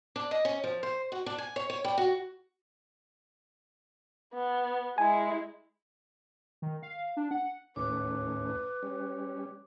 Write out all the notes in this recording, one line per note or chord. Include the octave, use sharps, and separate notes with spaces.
D4
D#5
C#4
F3
C5
F#4
D4
G#5
C#5
C#5
G3
F#4
B3
G#3 E4 G#5
D#3
F5
D4
F#5
D#2 A2 C#4 B4 D6
G3 C#4